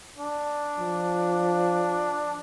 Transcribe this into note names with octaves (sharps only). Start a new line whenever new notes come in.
D4
F3